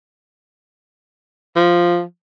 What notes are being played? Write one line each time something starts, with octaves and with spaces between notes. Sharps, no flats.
F3